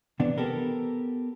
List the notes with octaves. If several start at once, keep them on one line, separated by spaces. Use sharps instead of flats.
C3 E3 B3 D4
B3 G4 A4 A#4